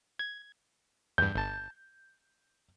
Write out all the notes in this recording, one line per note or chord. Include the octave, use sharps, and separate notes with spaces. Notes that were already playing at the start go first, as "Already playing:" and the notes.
G#6
E2 G2 G6
G1 A5